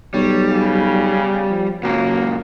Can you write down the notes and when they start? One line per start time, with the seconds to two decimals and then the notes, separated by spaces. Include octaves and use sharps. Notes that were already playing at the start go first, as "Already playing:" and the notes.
0.14 B1 G3 C#5
0.51 C#3
1.50 F3
1.83 F#2 A#2 C#3 F#3 A#3